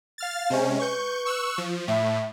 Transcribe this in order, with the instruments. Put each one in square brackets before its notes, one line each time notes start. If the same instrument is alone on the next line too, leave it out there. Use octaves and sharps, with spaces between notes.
[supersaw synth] F5 F6 A6
[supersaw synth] C3 G#3 C#4 [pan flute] C5
[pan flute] B4 [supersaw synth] C#6 G6
[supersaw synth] C#6 E6 F#6
F3
[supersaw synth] A2 [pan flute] E5